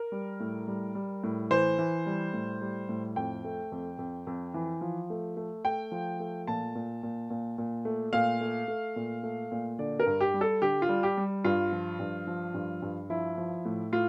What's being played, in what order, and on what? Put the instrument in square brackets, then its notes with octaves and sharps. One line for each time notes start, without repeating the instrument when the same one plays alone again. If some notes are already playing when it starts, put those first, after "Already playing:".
Already playing: [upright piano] A#4
G3
A2
G3
G3
A2
E3 C5
E3
G3
A2
G3
A2
F2 G5
A3
F2
F2
F2
E3
F3
A3
A3
A3 G5
F3
A3
A#2 A5
A#2
A#2
A#2
A#2
A3
A#2 F5
A3
A3
A#2
A3
A#2
D3 D5
A#4
G2
G4
G3
A4
D3 G4
F4
G3
G4
G3
G2 F4
F3
G2
F3
G2
G2
F3 E4
F3
A2
A2 F4